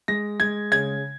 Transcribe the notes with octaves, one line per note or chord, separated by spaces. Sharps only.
G#3 A#6
G#3 G#6
C#3 G#6